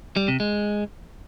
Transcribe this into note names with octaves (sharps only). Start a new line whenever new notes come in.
G3
C3
G#3